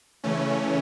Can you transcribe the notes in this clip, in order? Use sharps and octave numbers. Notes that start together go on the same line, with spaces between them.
C#3 E3 A3 C#4